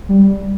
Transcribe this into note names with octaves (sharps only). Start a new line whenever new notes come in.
G3